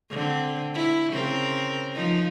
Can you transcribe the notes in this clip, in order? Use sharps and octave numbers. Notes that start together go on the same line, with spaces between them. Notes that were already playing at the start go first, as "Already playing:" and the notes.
D3 C4
E4
C#3 C4 A#4
F3 D#4